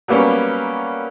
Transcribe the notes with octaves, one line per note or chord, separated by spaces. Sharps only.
F#3 G3 A#3 B3 C#4